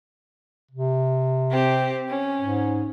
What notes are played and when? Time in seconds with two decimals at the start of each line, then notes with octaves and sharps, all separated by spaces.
0.71 C3
1.51 C4 G4
2.08 C#4
2.41 G#2